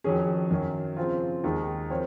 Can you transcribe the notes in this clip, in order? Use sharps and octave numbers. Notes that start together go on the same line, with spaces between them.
F2 D#3 F#3 C#4 G#4
F#2 D#3 F#3
C#3 F3 C4 F4
D#2 D#3 G#3 D#4
F3 C4 F4 A#4 C#5